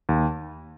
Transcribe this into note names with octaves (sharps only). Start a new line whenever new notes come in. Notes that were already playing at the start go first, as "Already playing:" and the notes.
D#2